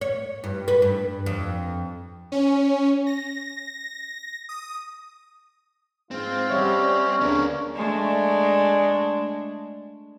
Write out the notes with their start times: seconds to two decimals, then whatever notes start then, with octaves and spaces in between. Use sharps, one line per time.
0.01 C#5
0.44 G2
0.68 B4
0.82 G2
1.26 F2
2.32 C#4
3.07 A#6
4.49 D#6
6.11 G#2 C4 F4
6.50 G3 C#4 C#5 E5 F#5
7.21 D2 C#3 B3 D4 A#4
7.74 G#3 A3 D4